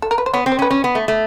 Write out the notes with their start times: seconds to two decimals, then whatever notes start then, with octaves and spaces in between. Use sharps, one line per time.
0.02 A4
0.11 A#4
0.18 B4
0.26 C5
0.33 B3 C#5
0.46 C4
0.52 C5
0.59 C#4
0.62 B4
0.71 C#4
0.84 B3
0.95 A3
1.08 A3